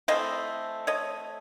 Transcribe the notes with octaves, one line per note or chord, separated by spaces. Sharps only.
E3 A3 C4 D#5 F5
C#5 D#5